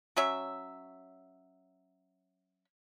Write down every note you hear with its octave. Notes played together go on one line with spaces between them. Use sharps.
F#3 C#4 E5